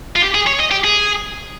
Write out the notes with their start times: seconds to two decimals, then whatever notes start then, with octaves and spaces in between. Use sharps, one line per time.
0.16 F4
0.22 G4
0.34 G#4
0.47 C#5
0.60 D#5
0.71 G4
0.84 G#4